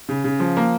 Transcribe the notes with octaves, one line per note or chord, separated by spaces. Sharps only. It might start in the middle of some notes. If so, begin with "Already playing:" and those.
C#3
C#3
F3
A#3